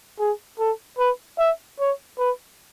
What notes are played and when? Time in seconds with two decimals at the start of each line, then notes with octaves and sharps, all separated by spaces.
0.19 G#4
0.59 A4
0.98 B4
1.39 E5
1.80 C#5
2.19 B4